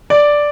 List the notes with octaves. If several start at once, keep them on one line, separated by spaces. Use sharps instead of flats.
D5